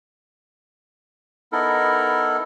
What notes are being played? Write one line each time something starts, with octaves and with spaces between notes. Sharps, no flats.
B3 D#4 E4 A4 A#4